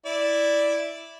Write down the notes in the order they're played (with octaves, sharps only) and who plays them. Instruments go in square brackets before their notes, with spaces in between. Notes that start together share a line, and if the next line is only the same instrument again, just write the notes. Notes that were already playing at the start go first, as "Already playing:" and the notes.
[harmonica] E4 D5